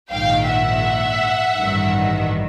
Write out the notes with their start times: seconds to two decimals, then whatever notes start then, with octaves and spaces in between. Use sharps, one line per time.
0.11 A#1 G#2 D#3 F5 G5
0.47 E5 F#5
1.58 A1 G2 D#3